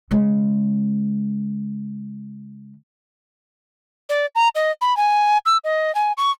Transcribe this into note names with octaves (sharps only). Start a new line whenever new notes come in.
C#3 G#3
D5
A#5
D#5
B5
G#5
E6
D#5
G#5
C#6